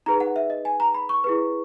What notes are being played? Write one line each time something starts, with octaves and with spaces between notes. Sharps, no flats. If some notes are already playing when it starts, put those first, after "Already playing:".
D#4 G#4 B4 A#5
F#5
E5
D#5
G#5
A#5
B5
C#6
E4 G#4 B4